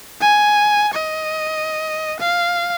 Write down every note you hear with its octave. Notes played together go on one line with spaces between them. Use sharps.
G#5
D#5
F5